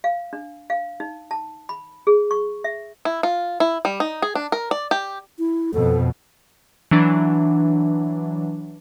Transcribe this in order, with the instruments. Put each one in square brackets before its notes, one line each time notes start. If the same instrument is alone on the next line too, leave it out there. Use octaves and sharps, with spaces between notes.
[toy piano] F5
D4
F5
D#4
A5
B5
G#4
C#6
E5
[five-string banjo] E4
F4
E4
G3
D#4
G#4
D4
A#4
D5
G4
[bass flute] E4
[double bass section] F2 B2 [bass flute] A4
[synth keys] E3 F#3 D4